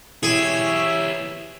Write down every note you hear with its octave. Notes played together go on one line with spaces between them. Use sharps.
E3 E4 G4 G#4 C#5 E5